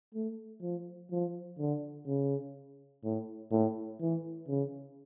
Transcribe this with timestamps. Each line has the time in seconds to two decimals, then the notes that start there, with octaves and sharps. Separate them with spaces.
0.14 A3
0.62 F3
1.11 F3
1.58 D3
2.07 C#3
3.04 A2
3.51 A2
4.01 E3
4.48 C#3